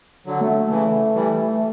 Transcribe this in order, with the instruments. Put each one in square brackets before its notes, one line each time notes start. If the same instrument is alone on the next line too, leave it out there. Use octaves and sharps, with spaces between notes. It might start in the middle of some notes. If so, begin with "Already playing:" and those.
[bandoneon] D3 F#3
[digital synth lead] A3
[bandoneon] C#3 E3
E3 G3